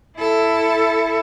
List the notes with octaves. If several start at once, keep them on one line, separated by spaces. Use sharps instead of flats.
E4 A4